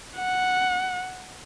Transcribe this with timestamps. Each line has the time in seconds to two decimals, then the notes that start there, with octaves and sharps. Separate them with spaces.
0.17 F#5